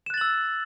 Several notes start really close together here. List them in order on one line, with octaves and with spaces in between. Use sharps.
E7 F#6 A6 F#7 E6